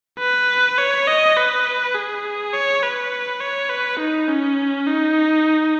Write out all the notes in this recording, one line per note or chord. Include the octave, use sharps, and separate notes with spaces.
B4
C#5
D#5
B4
G#4
C#5
B4
C#5
B4
D#4
C#4
D#4